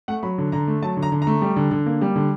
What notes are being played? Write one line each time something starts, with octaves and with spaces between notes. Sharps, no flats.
A3 F#5
F#3 B5
D3
D3 A#5
A3
F#3 A5
D3
A#5
D3
A#5
A3
G3
D3
D3
A#3
G3
D3